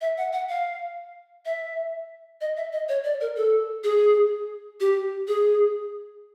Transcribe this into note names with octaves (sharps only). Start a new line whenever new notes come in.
E5
F#5
F#5
F5
E5
D#5
E5
D#5
C#5
D5
A#4
A4
G#4
G4
G#4